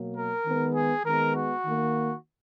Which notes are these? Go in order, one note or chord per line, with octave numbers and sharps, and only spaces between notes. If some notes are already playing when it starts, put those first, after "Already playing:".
Already playing: B2 F#3 A#3
A#4
D#3 G#3 B3
G#4
D#3 G#3 B3 A#4
F#4
D#3 A#3